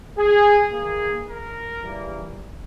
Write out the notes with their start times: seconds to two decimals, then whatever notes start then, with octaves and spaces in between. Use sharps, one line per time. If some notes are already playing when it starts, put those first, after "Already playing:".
0.18 G#4
0.72 D#3 A#3 G#4
1.28 A#4
1.83 C#3 E3 G3 A#3